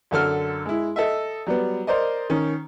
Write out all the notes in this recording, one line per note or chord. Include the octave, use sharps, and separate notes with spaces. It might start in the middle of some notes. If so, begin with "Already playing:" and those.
F#2 D3 A4 F6
G#3 E4
A4 D#5 E5
F#3 G3 B3
A#4 C5 D5 D#5
D#3 C#4